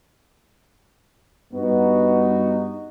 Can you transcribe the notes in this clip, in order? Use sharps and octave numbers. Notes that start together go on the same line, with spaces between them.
G2 B3 D#4 F#4